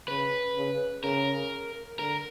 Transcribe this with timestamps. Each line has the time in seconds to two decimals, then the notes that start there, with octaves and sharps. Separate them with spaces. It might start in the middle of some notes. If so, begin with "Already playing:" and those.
0.08 C#3 B4
0.56 C#3
1.04 C#3 A#4
1.99 D3 A#4